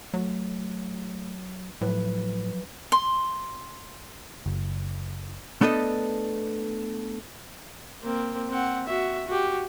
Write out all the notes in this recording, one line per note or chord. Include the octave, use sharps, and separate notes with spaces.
F#3 A3
A2 F3 F#3 B4
C6
F#1
A3 B3 D4 A4 D#5
A#3 C4
C4 F#5
F#4 E5
F#4 G4